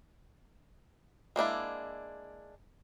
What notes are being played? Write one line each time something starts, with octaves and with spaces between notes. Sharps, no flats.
G#3 A#3 D4 E4